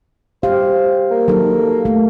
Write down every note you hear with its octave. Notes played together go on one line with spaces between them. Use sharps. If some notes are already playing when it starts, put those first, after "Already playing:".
G4 C5 F5
A#3
F#3 D#4 A4
A3